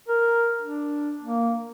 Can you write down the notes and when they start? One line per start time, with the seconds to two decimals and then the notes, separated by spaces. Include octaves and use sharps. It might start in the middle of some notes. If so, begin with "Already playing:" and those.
0.09 A#4
0.62 D4
1.23 A#3